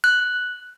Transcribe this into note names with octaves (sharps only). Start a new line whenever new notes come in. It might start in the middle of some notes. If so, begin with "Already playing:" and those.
F#6